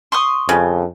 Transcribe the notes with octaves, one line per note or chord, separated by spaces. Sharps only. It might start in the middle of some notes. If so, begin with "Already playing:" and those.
C6 C#6 D#6
F2 C#3